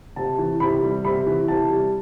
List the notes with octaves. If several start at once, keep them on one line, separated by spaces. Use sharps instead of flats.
C3 A5
E3
C3 B5
G3
C3 B5
E3
C3 A5
G3